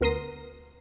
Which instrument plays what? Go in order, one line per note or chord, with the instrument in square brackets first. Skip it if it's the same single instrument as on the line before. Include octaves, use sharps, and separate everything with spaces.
[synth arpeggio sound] D2 B3 A#4 C6 D#6 A#6